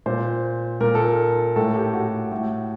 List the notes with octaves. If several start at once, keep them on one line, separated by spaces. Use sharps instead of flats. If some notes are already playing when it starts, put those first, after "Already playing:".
A#2 C5
A#2 A#4
A4
A#4
A2 A4
G4
F#4
A2